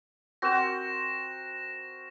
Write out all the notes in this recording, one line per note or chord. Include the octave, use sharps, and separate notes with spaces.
C4 F#4 A#4 A#6 E7